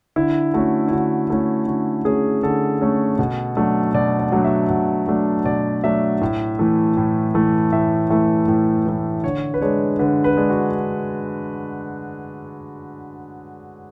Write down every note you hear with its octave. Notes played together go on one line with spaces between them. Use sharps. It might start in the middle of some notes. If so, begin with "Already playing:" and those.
D3 E4
A3 C#4 F#4
E4
D3 F#4
A3 C#4 E4
D3 F#4
A3 C#4 G#4
D3 A4
A3 C#4
B2
F#3 A3 D4
B2 D5
D5
F#3 A3 D4
E5
B2
F#3 A3 D4
B2 D5
F#3 A3 D4 E5
A2
E3 A3
A2
E3 A3
A2 E5
E3 A3 E5
A2
E3 A3
D3 C#5
B4
G#3 D4 C#5
D3 B4
B4
G#3 D4
F#4